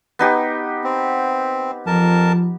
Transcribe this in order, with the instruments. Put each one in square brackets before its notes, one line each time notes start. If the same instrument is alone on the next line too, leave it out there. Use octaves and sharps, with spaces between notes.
[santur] B3 D#4 G4
[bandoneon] C4
[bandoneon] F2 A#4 A5 [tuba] F3